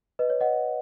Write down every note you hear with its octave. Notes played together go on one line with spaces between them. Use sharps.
B4 D#5
C#5
D#5 F#5